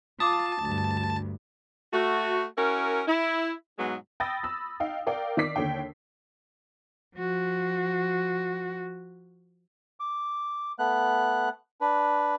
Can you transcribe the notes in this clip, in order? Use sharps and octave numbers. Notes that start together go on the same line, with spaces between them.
F4 A5 D6 D#6
D2 G2
A3 F#4
C#4 E4 F#4 A#4
E4
G#2 B2 F#3 G#3 B3
G5 B5 D#6 E6 A6 A#6
B5 E6
D#4 F5 G5
A#4 D5 F5 G5
D#3 D5 D6 B6 C7
D#2 D3 D4 C#5 G5
F3 F#4
D6
A3 B3 F#6
D4 B4